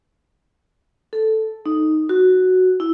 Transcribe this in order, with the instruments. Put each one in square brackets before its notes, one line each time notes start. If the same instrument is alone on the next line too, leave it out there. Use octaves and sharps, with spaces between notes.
[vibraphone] A4
D#4
F#4
E4